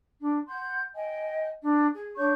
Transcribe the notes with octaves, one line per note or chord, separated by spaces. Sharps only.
D4
F#5 C6 G6
D#5 G5 G#5
D4
G#4
D4 C#5 C#6 G6